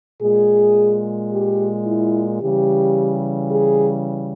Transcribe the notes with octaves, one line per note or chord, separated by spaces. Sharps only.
A#2 G#3 G#4
G4
E4
C#3 E3 G3 G4
G#4